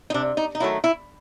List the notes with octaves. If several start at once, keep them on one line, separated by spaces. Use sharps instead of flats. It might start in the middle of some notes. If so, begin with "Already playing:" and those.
D#4
C3 D4
D#4
D#4
D#3 F#3 A3 E4
E4